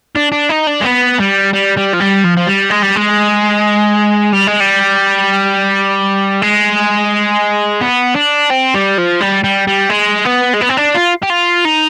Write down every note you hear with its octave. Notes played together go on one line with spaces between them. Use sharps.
D4
D4
D#4
D4
G#3
B3
G3
G3
G3
F3
G3
F3
F3
G3
G#3
G3
G#3
G3
G#3
G3
G#3
B3
D4
C4
G3
F3
G3
G3
G3
G#3
B3
G#3
B3
C4
D4
F4
G4
F4
D#4